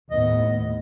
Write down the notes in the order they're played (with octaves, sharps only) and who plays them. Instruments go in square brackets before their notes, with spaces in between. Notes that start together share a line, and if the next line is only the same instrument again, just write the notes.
[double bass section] D#2 A2 B3 [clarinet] D#5